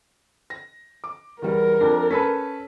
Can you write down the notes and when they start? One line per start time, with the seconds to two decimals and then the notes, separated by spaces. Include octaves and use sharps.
0.50 A#6
1.04 D6
1.42 E2 G3 A#4
1.81 F2 D4
2.11 C#4 A4 B4 B6